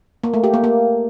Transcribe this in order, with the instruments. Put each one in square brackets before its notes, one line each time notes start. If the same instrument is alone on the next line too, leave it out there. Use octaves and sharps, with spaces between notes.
[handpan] A#3
A3
G4
A#3
A#3